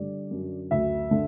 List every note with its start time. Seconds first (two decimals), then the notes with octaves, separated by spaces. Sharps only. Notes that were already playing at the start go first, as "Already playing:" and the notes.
Already playing: D3 G3 D5
0.31 F#2
0.71 D2 E5
1.11 D3